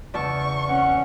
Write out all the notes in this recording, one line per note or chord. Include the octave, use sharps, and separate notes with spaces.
E2 C#3 D5 A5 C#6
C#4 F#5